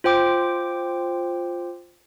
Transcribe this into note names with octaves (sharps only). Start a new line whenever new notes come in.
F4 C5 G5 D6